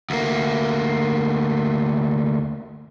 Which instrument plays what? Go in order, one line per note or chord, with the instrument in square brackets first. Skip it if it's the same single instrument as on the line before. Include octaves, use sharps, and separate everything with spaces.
[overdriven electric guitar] D2 A#3